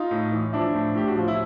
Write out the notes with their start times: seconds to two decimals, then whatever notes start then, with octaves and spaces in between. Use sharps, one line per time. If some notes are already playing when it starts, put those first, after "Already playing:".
Already playing: D#4 F4
0.11 A2
0.32 E3
0.53 F3 D4 E4
0.75 A2
0.95 A2 G4
1.08 F#4
1.17 F3 F4
1.28 E4